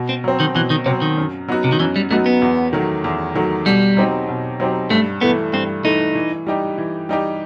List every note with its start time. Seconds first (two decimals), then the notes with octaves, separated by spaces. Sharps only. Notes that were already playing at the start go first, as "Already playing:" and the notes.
Already playing: B2
0.09 C4
0.24 F#3 C4
0.40 D#3
0.55 B2 E3
0.70 D#3
0.86 C3 F#3 C4
1.02 D#3
1.17 F#2
1.48 F#3 B3 D#4 F#4
1.64 C3
1.72 D#3
1.80 F#2 E3
1.96 G3
2.11 F#3 A3 B3 D#4 F#4
2.26 B3
2.42 E2
2.73 D#3 F#3 A3
3.04 E2
3.35 D#3 F#3 A3
3.66 B2 G3
3.97 F#3 C4 D#4 G4
4.29 B2
4.60 F#3 C4 D#4 G4
4.90 G2 A3
5.21 E3 A3 B3
5.53 G2 C4
5.84 E3 A3 D#4
6.15 E3
6.47 G3 D#4 G4
6.78 E3
7.09 G3 D#4 G4